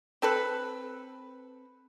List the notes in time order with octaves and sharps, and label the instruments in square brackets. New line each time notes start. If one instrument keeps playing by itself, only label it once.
[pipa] C4 A4 B4